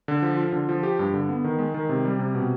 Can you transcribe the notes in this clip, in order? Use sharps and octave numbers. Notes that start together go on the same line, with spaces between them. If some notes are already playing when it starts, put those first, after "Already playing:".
D3
F3
F4
D3
F3
G4
G2
D3
B3
D#3
G#3
D#3
C3
G3
C3
B2